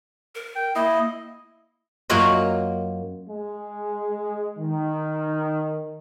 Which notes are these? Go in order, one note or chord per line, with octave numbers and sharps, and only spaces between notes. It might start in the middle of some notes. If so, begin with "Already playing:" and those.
A#4
G5
A#3 E4 D#5
F#2 A#3 F4 F#4 C#5 D#5
G#3
D#3